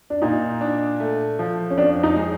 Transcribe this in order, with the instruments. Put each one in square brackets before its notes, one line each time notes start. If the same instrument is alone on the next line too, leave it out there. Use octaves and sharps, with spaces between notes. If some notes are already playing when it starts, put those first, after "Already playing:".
[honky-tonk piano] D4
[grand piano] A#2 [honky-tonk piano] D#4
[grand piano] D4
A3
F3
[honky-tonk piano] C#4
[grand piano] F2 [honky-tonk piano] D4
[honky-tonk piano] D#4
[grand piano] G#3